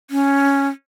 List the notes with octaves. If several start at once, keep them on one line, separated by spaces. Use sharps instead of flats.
C#4